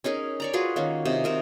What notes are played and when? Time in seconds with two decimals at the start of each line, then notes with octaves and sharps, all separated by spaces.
0.04 C#4 D#4 G#4 A#4
0.40 C#5 D5 A#5
0.53 F4 F#4 G#4 B4
0.76 D#3 A#3 C#4
1.05 C3 D#4
1.24 C3 A#4 C#6